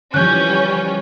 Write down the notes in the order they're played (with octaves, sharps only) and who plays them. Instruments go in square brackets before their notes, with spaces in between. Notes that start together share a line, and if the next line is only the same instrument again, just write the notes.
[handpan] D3 E3 F3 [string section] G3 C#4 [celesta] F#6 G6